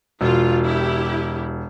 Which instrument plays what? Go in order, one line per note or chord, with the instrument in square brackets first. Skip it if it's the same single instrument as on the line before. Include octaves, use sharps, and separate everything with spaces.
[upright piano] E1 [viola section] F4
[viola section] E4 G4